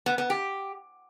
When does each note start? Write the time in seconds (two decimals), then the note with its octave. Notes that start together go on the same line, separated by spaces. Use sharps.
0.06 B3
0.18 B3
0.30 G4